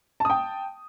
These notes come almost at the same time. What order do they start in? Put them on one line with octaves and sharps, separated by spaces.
A5 D#6 G5